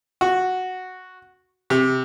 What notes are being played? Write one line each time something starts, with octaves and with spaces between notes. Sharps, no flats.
F#4
C3